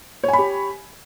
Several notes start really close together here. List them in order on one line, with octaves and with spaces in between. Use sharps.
C#5 G#5 B5 G4